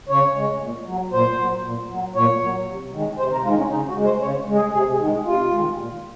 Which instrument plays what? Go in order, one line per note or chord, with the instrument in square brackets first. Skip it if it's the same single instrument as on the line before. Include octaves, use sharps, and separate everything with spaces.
[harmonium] C#3 C#5
G#3
A#2
F#3
A#2 C5
F#3
A#2
F#3
A#2 C#5
F#3
C3
D#3 G#3
C3 C5
A#4
D#3 G#3 F4
C#4
C#3 D#4
F#4
G#3
C5
C#3 C#5
G#3
G#4
C3 G#4
G#4
D#3 G#3
C3 F4
D#3 G#3
A#2